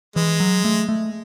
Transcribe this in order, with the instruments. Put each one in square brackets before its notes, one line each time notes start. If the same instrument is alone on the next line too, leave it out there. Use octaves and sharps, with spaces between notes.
[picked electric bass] E3 [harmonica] G#3
[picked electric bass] F#3
A3
A3